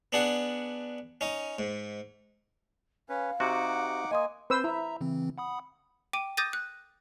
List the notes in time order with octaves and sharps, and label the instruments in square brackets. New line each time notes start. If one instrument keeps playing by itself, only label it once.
[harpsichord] B3 D4 G#4 F#5
C#4 D#4
G#2
[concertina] C#4 B4 [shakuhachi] F5
[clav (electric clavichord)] C3 F#4 [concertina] D#4 F#5 D6
[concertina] A#3 G#5 [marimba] D#5 C6 D#6
[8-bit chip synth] C4 [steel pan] B4 C5 E6
[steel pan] E4 [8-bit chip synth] E5 A#5
[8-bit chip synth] C#3 E3 C4
F#5 B5 D#6
[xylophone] G5 D6 D#7
D6 D#6 G6 A6 A#6 D#7
F#6